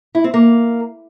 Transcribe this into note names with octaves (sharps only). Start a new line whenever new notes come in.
E4
C4
A#3